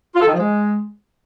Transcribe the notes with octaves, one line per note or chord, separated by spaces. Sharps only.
F4
A4
D#3
F3
G#3